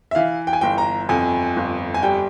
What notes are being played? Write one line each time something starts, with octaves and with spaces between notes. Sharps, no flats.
E5
E3 F5
G5
G#5
G1 G5
A#5
F2 G#5
G1
G#5
G3 G5